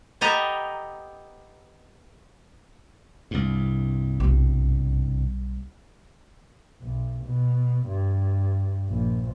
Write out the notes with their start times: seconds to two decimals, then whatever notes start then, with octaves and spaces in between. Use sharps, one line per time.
0.21 B3 G4 A4 D#5 G#5 A#5
3.31 C2 G2
4.20 B1 G3
6.81 B1
7.25 B2
7.87 G2
8.89 A#1